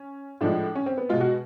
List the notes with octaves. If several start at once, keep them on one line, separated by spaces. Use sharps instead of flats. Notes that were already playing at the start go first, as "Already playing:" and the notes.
Already playing: C#4
A2 F3 G#3 D4
C#4
C4
B3
B2 G#3 F4
F#4